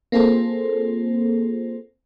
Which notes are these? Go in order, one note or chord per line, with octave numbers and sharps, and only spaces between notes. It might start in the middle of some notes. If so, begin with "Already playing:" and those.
A#3 C4 F4 G#4 A4 C5